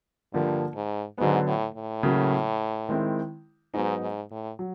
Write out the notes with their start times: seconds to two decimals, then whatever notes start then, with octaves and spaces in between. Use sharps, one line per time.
0.34 G2 D3 F3 A#3
0.75 G#2
1.18 G#2 D3 F#3 B3
1.47 A2
1.75 A2
2.03 C#3 F#3 A#3
2.89 D#3 G#3 C4 E4
3.74 G#2 F#3 B3 D#4
4.02 G#2
4.31 A2
4.59 F#3